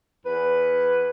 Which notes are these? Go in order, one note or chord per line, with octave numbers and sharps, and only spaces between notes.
E2 B4